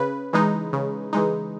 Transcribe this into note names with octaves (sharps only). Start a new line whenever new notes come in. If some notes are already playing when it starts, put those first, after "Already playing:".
Already playing: C#3 B4
E3 G#3 D#4
C#3
E3 G#3 D#4